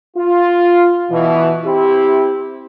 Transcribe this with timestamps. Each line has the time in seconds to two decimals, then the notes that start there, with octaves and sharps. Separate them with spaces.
0.17 F4
1.11 B2 E3
1.65 C4 E4 G4